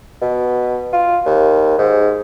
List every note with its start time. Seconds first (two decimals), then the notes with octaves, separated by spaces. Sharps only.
0.21 B2
0.92 F4
1.26 D#2
1.78 G#2